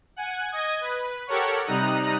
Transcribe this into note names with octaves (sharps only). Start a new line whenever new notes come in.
F#5 G#5
D#5 D#6 G#6
B4
G4 A4 A#4 C#5 F#5 C#6
C3 G3 D#4 A#5 D#6 F#6